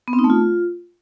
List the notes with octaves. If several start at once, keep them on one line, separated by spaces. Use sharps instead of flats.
B3
C4
D#4
A3
F4